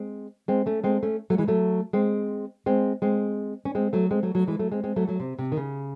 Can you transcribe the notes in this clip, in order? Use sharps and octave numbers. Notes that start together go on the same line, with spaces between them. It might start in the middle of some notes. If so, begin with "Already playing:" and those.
Already playing: G#3 C4
G#3 C4
A3 C#4
G#3 C4
A3 C#4
F#3 A3
E3 G#3
F#3 A3
G#3 C4
G#3 C4
G#3 C4
C#4
G#3 C4
F#3 A3
G#3 C4
F#3 A3
F#3 A3
E3 G#3
F#3 A3
G#3 C4
G#3 C4
F#3 A3
F#3 A3
C3
C3
D#3
C#3